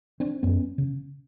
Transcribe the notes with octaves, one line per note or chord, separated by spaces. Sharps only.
C4 D4
F#2 B3 C#4
C#3